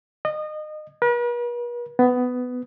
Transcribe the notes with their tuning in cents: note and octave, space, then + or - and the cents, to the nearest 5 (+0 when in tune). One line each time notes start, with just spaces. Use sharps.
D#5 -25
B4 -45
B3 +15